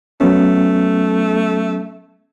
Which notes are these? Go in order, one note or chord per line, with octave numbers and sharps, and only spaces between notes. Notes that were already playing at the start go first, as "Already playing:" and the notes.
F#3 A3 B3 C#4